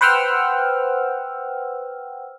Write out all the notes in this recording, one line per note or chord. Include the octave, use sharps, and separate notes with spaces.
B4 C5 F#5 G5 E6 F6